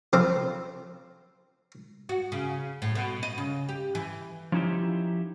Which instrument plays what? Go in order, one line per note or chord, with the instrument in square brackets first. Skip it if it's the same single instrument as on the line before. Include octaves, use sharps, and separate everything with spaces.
[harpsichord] F3 C4 A4 C5
[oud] F#4
C#3
A2
B2
D#5
C#3
G4
E3
[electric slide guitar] F3 C#4 D#4 E4 G4